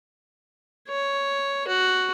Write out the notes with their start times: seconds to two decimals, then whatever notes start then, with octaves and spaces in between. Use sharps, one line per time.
0.88 C#5
1.67 F#4